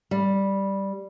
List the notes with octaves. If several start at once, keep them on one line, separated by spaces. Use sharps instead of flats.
G3